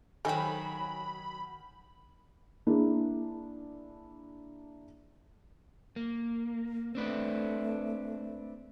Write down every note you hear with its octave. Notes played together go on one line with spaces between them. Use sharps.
D#3 F#3 A4 D#5 G5 G#5 B5
A#3 D4 E4 G#4
A#3
A3 C4 D4 B4